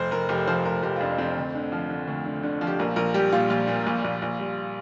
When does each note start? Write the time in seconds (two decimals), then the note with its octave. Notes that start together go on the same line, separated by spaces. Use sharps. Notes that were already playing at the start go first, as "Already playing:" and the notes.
Already playing: F1 C5
0.11 F1 A#4
0.29 F1 G4
0.47 F3 C5
0.65 F1 A#4
0.83 F1 G4
0.96 F4
1.01 F2 D4
1.18 F2 C4
1.37 D2
1.55 D3
1.72 F3
1.90 D3
2.08 D2
2.25 D3
2.43 D3
2.61 F3
2.67 G4
2.79 A#1 A#4
2.96 A#1 A#4
3.14 G3 G4
3.32 A#2 F4
3.50 A#1 F4
3.67 A#2
3.86 A#1
4.04 A#1
4.22 A#1
4.39 G3